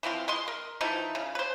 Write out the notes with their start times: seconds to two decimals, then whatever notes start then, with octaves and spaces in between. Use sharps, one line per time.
0.03 E3 F3 C4 F4
0.28 G#3 D#5 C6
0.48 A#4
0.81 E3 F3 A3 D#4
1.15 C#3
1.35 B4 C5